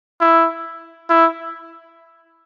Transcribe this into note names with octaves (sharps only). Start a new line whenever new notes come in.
E4
E4